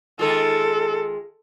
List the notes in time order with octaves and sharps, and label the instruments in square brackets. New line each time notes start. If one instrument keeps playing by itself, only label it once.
[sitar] D#3 G#3 F4 [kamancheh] A4